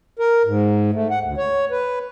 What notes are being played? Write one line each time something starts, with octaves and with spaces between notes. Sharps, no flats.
A#4
G#2
A3
F#5
D2
C#5
B4